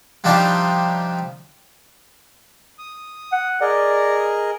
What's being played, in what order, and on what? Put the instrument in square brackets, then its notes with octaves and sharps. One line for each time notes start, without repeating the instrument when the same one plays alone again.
[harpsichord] C3 F3 G3 D4 D#4 F4
[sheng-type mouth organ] D#6
[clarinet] F#5
[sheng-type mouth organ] G#4 A#4 D#5 [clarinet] D5